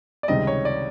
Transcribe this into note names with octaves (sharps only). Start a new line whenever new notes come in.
D5
C#2 C3 D#3 G3 C4 D#5
C#5
D5